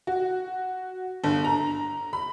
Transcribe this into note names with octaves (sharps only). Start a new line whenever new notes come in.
F#4
G1
A#5
B5